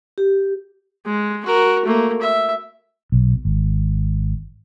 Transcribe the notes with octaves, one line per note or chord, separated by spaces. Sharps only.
G4
G#3
F#4 A#4
A3 A#3
E5
B1
G#1